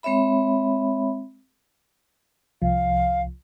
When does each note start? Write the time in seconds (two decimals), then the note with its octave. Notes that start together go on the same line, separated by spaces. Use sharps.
0.03 G#3 C4 C#5 E5 B5
2.62 C2 F3 F5